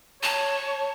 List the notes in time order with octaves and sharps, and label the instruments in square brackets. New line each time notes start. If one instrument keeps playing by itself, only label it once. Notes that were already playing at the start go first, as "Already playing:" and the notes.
[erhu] C#5 [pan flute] A5